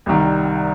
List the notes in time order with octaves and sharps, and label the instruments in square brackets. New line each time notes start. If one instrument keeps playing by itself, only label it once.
[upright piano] C2 C3 D#3 G3